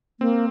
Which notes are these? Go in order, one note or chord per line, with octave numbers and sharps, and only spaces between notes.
A#3 C4